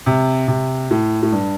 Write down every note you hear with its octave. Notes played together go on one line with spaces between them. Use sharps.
C3
C3
A2
A2
G2